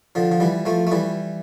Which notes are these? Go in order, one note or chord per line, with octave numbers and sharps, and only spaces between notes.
D3 F3
F3
E3 G3
F3 A3
A3
E3 G3